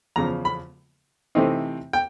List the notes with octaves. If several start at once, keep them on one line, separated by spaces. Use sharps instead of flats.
E2 C#3 F3 A#5
B5
C3 E3 A3 C4 D#4
G5